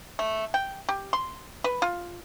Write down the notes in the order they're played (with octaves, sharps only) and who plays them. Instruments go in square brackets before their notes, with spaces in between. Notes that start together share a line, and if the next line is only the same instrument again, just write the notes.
[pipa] A3
G5
G4
C6
B4
F4